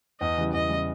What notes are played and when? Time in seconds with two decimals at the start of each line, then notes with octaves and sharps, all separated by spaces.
0.20 E2 D#5
0.37 C#3 E3 G3
0.53 E2 D#5
0.69 C#3 E3 G3